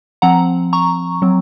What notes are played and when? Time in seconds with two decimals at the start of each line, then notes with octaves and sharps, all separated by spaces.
0.22 F3 C4 F#5 A#5
0.73 A#5 C#6
1.22 F#3 C4